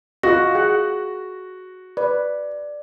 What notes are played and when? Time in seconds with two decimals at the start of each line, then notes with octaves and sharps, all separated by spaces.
0.23 F4 F#4 D#5 A#6
0.55 G#4 F#5
1.97 B4 D5